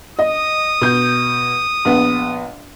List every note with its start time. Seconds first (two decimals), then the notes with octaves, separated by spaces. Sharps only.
0.19 D#5 D#6
0.81 B2 G6
1.85 A#1 B3